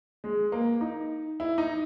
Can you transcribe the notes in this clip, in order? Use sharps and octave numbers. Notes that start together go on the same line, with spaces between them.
G#3
A#3
D#4
E4
D#4